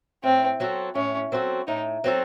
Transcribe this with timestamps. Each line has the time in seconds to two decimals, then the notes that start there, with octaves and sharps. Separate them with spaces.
0.24 A2 C4
0.60 F#3 C4 F#4 A4
0.95 A2 C#4
1.32 F#3 C4 F#4 A4
1.67 A2 D#4
2.04 F#3 C4 F#4 A4